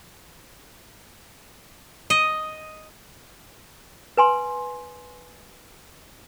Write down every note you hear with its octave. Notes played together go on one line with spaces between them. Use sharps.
D#5
B4 G#5 C6